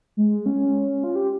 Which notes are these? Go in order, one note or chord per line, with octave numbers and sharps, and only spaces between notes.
G#3
C#4
F4
G4